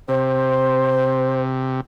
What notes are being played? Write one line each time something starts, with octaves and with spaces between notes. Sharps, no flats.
C3 C5